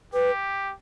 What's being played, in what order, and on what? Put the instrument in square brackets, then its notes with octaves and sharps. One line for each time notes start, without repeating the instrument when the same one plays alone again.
[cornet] G4 [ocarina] B4